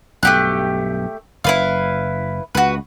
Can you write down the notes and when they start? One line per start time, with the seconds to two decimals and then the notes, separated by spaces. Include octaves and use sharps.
0.23 B1 G2 A3 G4 F#6
1.44 F#1 E4 B4 F5
2.55 C#2 F#4 B4